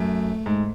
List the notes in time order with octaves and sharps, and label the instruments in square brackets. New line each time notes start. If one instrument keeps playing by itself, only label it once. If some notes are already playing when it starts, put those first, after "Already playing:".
Already playing: [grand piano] F#2 [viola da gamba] A3
[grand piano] G#2